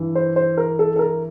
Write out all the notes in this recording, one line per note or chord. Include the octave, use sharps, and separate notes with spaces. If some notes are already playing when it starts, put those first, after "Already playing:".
Already playing: G2 E3
C5
C5
A#4
A4
A4
A#4